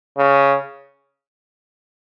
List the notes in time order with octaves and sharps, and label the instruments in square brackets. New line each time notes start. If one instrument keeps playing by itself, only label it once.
[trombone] C#3